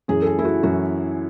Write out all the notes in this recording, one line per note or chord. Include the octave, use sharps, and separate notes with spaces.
F#2 E3 G#4
A4
G#4
E4
F#4
F#2 E3 F#4